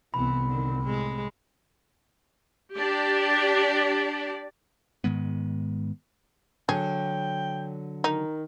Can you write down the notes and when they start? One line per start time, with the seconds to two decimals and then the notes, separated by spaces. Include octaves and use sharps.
0.14 C2 E3 B3 C4 B5
0.46 D3 D#3
0.81 A2 G#3
2.75 D4 G4 D5
5.04 G#2 D#3 G#3 B3
6.69 D3 F#3 G#4 G5
8.04 D#3 D#4